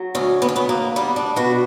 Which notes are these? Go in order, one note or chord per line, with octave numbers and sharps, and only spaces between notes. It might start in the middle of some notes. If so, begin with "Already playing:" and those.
Already playing: F#3
D2 C#4
B3
C#4
D2 B3
A#3
G3 B3
D4
B2 F#4